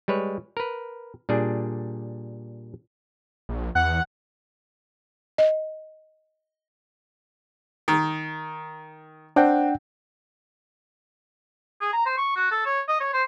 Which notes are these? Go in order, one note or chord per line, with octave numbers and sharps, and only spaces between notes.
G3 G#3 B4 C#5
A#4 B4
A#2 G3 D4 G#4
A#1
E2 F#5
D#5
D#3
C4 D4 F#5 G5
G#4
A#5
C5
C#6
F#4
A4
C#5
D#5
C#5
C5